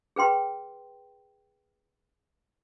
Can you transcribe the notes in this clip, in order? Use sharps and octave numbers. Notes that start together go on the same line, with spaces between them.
G#4 B4 G5 C6